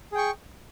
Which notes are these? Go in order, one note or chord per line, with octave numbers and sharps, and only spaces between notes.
G#4 G5 C#6